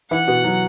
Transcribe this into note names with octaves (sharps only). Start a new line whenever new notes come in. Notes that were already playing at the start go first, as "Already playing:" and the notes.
E3 E4 F#5
B2 B3
F#3